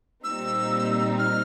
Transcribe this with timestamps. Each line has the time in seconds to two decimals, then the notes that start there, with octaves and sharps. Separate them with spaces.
0.24 A#2 G3 C4 D#4 E6
1.19 F6